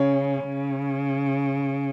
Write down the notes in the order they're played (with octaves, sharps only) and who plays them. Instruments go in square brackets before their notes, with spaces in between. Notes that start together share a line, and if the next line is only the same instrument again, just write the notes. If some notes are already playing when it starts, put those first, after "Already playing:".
Already playing: [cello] C#3 [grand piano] C#4
[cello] C#3